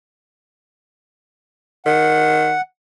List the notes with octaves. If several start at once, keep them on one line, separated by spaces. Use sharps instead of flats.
D#3 F#5